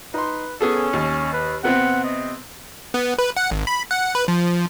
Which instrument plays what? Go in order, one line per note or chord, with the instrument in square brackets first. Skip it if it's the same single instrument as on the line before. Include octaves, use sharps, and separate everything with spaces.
[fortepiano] D#4 C6 [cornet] B4
[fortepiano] B3 G#4 A4 [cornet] C#4
[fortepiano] D#2
[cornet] B4
[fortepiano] C3 B3 C4 [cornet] F#5
[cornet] D#5
[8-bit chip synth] B3
B4
F#5
G#1
B5
F#5
B4
F3